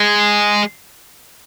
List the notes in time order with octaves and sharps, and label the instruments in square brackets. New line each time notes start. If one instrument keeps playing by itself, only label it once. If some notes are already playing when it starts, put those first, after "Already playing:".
Already playing: [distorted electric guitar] G#3